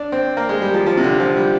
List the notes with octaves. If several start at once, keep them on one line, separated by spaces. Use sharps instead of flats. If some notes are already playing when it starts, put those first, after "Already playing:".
Already playing: D4
C4
A#3
G#3
G3
F3
F3
C3
D3
F3
G3